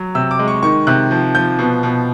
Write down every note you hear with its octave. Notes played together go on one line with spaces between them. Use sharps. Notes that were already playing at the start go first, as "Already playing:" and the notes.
Already playing: F#3
C3 E6
D6
G#3
C#6
D#3 C#6
C3 F#6
F3
F3 G6
B2
B2